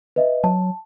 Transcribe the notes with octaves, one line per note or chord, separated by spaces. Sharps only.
B4 D#5 E5
F#3 A5